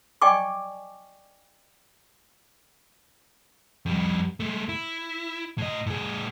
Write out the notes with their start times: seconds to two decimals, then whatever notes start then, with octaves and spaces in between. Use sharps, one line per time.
0.22 D5 D#5 G5 G#5 C#6 D6
3.86 F2 G3
4.40 G#3 A3
4.69 E4
5.58 A2 D#5
5.87 A2 G#4